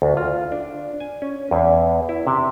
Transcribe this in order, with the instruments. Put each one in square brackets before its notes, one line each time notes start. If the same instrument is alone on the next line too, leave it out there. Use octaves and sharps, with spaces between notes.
[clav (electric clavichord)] D2
F4
D4
G#5
C#4
E2
E4
C3